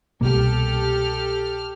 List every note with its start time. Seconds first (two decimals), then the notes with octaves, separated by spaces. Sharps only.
0.21 C2 B2 A#3 G4 A4 F6